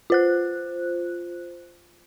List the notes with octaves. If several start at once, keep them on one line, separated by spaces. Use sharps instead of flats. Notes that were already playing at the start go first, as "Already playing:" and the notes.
F4 C5 F#6